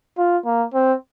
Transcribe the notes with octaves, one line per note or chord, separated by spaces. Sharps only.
F4
A#3
C4